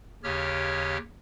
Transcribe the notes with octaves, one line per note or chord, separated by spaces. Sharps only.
D#2 C#3 G4 C#5 F6